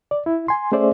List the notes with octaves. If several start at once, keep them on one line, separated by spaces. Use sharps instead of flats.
D5
E4
G#5 C6
A3 C#4 G#4 C5 D5 E5